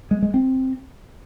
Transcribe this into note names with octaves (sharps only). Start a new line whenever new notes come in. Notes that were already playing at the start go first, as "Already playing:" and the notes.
G#3
G#3
C4